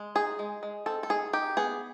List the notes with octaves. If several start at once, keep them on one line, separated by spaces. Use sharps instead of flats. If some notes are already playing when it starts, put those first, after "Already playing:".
Already playing: G#3
D#4 G#4
G#3
G#3
C4 A4
A4
D#3 G#4
D#4 G4
B3 G#4